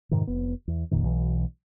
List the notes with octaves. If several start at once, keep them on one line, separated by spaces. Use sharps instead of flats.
F2 G#2 C3 D#3
F1 B3
E2
F1 F2 A#2 D#3
B1 B2 E3